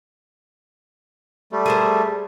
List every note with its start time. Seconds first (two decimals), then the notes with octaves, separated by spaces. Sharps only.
1.52 G3 A3
1.66 G#4 A#4 C5